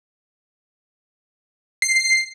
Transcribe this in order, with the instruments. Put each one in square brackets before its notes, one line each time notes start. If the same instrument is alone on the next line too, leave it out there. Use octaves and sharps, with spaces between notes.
[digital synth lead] C7